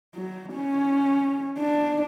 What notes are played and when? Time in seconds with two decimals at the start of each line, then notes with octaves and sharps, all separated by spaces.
0.16 F#3
0.53 C#4
1.59 D4